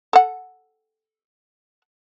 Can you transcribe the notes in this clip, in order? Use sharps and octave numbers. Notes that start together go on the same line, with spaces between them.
A4 F#5